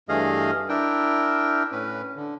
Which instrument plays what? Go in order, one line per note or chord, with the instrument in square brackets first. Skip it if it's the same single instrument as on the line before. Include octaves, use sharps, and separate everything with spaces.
[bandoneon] G2 E3 A3 G#4 D#5 F5
D4 E4 A#4 G5
A2 C#4 B4
D3